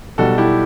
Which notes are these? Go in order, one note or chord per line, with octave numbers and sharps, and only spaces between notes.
B1 B2 G3 F#4 A4
E4 G4